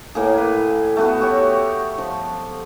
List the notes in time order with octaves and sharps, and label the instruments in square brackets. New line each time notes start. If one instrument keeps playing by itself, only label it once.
[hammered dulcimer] A2 A#3 G#4
B4
A3 B3 F#4
F#4 G4 C#5
F3